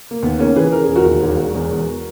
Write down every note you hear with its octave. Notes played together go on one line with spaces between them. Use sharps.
A#3
D#2 B3
C#3 A#3 C#4
E3 G#4 B4
C#3 A#4
E1 G#4
F#4 A#4
D#2
E1
E1
E2
E2